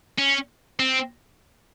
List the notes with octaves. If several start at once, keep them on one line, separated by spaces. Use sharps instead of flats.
C#4
C4